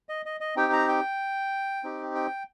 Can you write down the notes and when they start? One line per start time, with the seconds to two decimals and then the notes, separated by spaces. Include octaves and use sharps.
0.09 D#5
0.26 D#5
0.40 D#5
0.56 C4 D#4 G4 G5
0.73 A#5
0.88 G5
1.83 C4 D#4 G4
2.15 G5